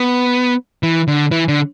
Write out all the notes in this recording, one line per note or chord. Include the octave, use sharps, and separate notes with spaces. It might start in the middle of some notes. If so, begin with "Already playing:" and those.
Already playing: B3
E3
D3
E3
D3